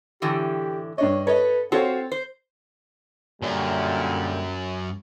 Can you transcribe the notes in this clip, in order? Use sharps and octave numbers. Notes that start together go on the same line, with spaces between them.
A2 D3 E3 G4
G2 D4 C#5 D#5
A4 B4 C#5 D#5
C4 F4 F#4 A4 C5 C#5
C5
F#2 A#2 D3 G3